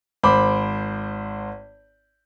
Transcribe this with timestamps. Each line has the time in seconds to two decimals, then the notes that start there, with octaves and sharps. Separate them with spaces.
0.23 G#1 C5 B5 D6